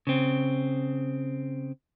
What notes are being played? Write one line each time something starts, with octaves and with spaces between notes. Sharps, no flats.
C#3 C4